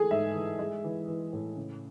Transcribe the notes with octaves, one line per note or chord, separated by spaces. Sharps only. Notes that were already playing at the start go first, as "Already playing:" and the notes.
Already playing: E3 G#3 A3 G#4 A4
G#2 E5
E3
G#3
E3
E3
A2
C#3